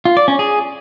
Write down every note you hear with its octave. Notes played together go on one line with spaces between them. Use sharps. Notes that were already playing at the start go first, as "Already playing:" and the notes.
F4
D5
C#4
G#4